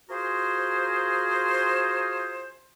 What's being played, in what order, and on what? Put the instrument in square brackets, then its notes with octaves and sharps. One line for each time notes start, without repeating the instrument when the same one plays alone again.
[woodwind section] F4 F#4 G#4 A#4 C5